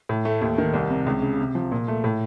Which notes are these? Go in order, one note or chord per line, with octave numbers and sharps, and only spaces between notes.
A2
A3
D#2
D#3
C2
C3
C#2
C#3
C3
F3
A#2
A3
A2